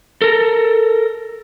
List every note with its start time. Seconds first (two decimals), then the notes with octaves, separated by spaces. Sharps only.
0.22 A4 A#4